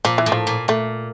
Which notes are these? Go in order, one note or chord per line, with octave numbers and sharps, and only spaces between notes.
A#2 F3
E3
A2
F3
A#2
A#2 A3